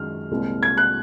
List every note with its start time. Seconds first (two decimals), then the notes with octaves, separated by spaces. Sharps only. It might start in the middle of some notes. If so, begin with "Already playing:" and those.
Already playing: F#2 D#3 G#3 D#4 F6
0.31 C2 A#2 G#3 C4
0.63 G#6
0.77 F#6